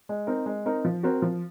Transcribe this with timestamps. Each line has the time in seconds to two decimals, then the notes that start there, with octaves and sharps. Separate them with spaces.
0.09 G#3
0.27 C4 D#4 A#4
0.46 G#3
0.66 C4 D#4 A#4
0.85 F3
1.03 C4 F#4 A#4
1.22 F3